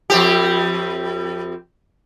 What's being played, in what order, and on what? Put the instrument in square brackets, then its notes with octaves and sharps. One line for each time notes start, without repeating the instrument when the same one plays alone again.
[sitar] F2 C4 G4